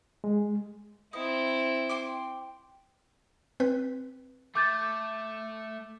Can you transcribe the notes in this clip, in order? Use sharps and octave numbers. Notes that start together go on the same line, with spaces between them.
G#3
C4 E4 D#5
G5 C6 D6
C4 B4
A3 D6 G6 A6